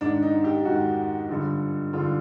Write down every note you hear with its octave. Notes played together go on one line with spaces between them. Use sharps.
G#2 D#3 D4
D#4
G4
G#2 D#3 F#4
G2 D3 F3
G2 D3 F3 F4